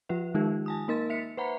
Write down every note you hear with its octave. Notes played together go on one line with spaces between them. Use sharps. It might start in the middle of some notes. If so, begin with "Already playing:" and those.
F3 F4 B4 E5
D#3 G#3 D#4 F4 G4
G#5 A5 D#6
A#3 D#4 A#4 D#5 C6 A6
E5 B6 C#7
B4 C5 E5 F#5 A#5 B5